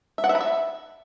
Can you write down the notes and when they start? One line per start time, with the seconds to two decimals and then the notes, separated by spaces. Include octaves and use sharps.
0.18 E5
0.24 F#5
0.29 E5
0.35 B5
0.40 E5